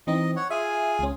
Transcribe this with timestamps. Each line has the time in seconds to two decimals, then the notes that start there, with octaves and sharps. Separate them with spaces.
0.07 E3 C4 D#4 D#5
0.36 C#5 F#5
0.50 F4 G#4 E5 G#5
0.99 C#2 C#4